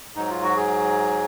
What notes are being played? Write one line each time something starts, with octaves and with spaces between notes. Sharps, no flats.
G#2 F#3 D#4
F4
F#4
G#4